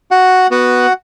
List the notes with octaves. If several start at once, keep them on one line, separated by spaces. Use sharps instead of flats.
F#4 F#5
B3 F#4 F#5